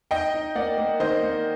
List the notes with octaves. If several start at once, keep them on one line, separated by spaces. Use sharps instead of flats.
D#4 D#5 G5
D#4
A#3 D5 F#5
A#3
D#3 C5 D#5
A#3